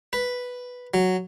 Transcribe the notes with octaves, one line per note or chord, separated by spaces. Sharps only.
B4
F#3